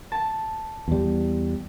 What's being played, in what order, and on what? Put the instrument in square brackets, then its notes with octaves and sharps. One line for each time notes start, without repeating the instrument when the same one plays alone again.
[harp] A5
[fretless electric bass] E2 G3